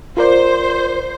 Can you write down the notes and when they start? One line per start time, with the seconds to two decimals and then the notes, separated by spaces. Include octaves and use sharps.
0.17 F4 A#4 C5 D5